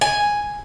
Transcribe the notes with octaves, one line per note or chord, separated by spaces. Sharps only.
G#5